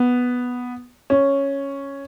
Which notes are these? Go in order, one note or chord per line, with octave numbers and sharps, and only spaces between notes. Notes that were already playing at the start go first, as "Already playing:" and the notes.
Already playing: B3
C#4